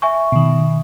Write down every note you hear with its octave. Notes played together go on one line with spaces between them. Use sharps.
E5 G#5 C#6
B2 D#3